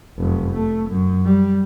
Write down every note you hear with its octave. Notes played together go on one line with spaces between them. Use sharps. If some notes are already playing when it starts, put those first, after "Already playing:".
F1 F#2
A3
F#2
G3